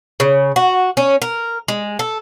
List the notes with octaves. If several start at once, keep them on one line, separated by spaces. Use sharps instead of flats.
C#3
F#4
C#4
A#4
G#3
A4